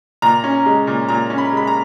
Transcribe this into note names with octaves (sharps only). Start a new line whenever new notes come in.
A#2 A#5
C#4
G#3
A#2
A#2 A#5
C#4
B5
G#3 B5
A#5